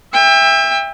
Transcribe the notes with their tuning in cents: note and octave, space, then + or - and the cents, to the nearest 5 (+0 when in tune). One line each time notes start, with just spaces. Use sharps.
E5 +0 G5 +35